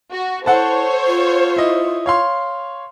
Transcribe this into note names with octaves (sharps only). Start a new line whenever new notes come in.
F#4
E4 A4 C5 C#5 F#5 A5
F4
E4 D#5
C#5 F5 C6